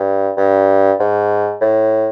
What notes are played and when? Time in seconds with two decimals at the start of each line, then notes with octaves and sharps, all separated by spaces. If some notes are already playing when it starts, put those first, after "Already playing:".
Already playing: G2
0.37 G2
0.99 G#2
1.61 A2